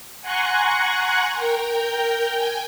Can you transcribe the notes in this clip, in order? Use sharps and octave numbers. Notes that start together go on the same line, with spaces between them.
F#5 G#5 A#5 C6 C#6 F#6
A#4 G5 G6
G5 G#5